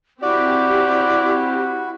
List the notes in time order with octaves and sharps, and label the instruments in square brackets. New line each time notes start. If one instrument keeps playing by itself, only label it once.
[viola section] C4 G4 [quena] E4 [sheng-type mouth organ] F#4 [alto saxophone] D5